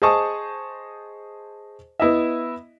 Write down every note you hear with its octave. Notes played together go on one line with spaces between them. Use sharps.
G#4 C5 D#5 A5 C#6 D#6
B3 E4 D#5 E5